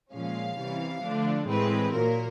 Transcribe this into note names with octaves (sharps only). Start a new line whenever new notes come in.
A#2 F3 G#3 C#4 F5
C3 E3 G3
D3 F3 A3 D4
A2 E3 G#3 C4 B4
A#2 F#3 A#3 A#4